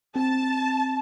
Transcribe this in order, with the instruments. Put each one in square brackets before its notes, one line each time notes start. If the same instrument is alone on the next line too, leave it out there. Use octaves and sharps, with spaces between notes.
[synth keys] C4 [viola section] A5